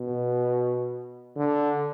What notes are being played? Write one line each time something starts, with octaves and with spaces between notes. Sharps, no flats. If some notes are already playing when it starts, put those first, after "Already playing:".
Already playing: B2
D3